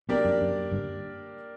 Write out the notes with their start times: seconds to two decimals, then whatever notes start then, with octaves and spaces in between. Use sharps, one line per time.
0.09 B1 B2 A#3 D4 G4 A#4 D5
0.25 F#2
0.41 F#2
0.71 G1 G2